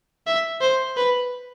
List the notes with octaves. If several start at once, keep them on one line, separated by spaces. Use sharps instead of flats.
E5
C5
B4